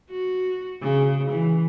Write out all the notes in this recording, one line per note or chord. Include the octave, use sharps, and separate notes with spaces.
F#4
C#3
E3